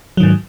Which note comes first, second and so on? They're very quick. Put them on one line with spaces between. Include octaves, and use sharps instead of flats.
F#3 D#3 G#2